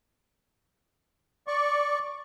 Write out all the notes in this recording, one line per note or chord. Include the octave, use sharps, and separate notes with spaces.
D5 C#6